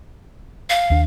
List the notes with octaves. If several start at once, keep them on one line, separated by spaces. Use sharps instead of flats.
F5
D#2 D4